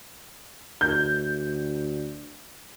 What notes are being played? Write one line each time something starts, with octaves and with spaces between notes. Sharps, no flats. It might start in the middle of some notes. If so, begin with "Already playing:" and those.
D2 G6